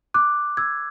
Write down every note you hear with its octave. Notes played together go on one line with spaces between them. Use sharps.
D6 F#6
E6 G#6